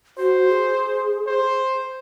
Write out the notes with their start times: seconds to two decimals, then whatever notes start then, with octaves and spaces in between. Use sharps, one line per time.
0.18 F#4 C5
0.49 G#4
1.27 C5